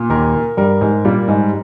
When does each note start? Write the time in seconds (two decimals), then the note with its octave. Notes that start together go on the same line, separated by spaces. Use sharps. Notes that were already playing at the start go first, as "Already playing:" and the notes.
Already playing: A#2
0.10 D#2 D#3 A#4
0.57 G2 G3 A#4
0.81 G#2 G#3
1.05 A#2 G3 A#3
1.28 G#2 G#3